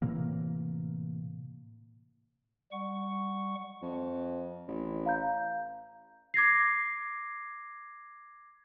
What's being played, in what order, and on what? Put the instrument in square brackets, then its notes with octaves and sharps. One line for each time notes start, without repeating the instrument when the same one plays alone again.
[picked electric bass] A2 C3 E3 A#3
[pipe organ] G3 F#5 C#6
[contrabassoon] F2
A1
[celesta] F5 A#5 G6
D6 G#6 A#6 C7